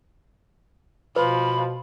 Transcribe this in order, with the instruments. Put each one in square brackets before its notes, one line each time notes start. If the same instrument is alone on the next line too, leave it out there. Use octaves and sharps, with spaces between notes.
[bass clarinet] B2 [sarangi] F3 [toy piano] B4 [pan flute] B5